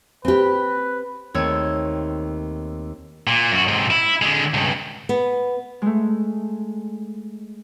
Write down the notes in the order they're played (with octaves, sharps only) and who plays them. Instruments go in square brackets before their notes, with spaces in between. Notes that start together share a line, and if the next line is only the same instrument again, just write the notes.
[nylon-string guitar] C4 G4 [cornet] B4
[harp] D#2 A3 C4 C#5 E6 G#6
[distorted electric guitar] A#2
F#2 F#4
G#2 C3
E4
D3 G#3
C#2 G2
[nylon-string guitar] B3
[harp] G#3 A3